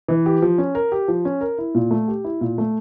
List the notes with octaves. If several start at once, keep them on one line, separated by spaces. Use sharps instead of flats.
E3
G4
F3
C#4
A#4
G4
F3
C#4
A#4
E4
A#2
A3
G4
E4
A#2
A3